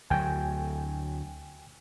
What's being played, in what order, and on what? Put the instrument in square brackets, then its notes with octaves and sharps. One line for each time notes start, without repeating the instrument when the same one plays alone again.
[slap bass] D2 F#3 [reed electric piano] G5 G#5